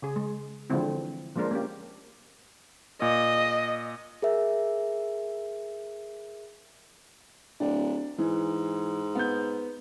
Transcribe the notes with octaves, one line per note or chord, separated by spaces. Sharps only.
C#3 G#4
G#3
D3 E3 F3 G#3 C4 E4
F3 G#3 A#3 D4 A#4 C5
A#3 C#4 G4
A#2 D#5
G#4 A#4 E5
D1 D4
G#2 E3
B3 G6